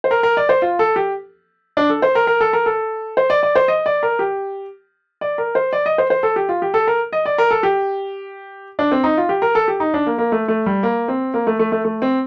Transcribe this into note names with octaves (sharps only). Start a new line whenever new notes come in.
C5
A#4
A#4
D5
C5
F4
A4
G4
D4
A4
C5
A#4
A#4
A4
A#4
A4
C5
D5
D5
C5
D#5
D5
A#4
G4
D5
A#4
C5
D5
D#5
C5
C5
A4
G4
F4
G4
A4
A#4
D#5
D5
A#4
A4
G4
D4
C4
D#4
F4
G4
A#4
A4
G4
D#4
D4
A#3
A#3
A3
A3
G3
A#3
C4
A#3
A3
A3
A3
A3
C4